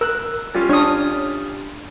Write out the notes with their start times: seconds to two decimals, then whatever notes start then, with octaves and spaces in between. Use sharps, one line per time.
0.01 A#4 E6 F#6
0.55 G3 C#4 F4
0.70 D4 C#5 D#6